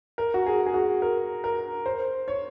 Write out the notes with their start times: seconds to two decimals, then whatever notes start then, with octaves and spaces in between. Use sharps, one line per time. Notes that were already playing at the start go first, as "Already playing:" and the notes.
0.18 A#4
0.34 F#4
0.46 G#4
0.66 G#4
0.74 F#4
1.02 A#4
1.44 A#4
1.86 C5
2.28 C#5